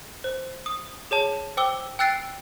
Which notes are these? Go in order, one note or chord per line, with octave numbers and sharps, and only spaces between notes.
C5
D#6
G#4 C#5 A5
C5 G5 D6 E6 G7
G5 E6 F#6 A6 C7 D7